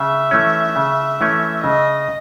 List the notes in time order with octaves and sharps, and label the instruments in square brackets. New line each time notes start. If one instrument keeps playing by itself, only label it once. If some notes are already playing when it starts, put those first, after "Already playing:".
Already playing: [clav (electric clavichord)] C#3 [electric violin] E5
[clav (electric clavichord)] E3 A3 C#4
C#3
E3 A3 C#4
[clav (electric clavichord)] C#3 [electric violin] D#5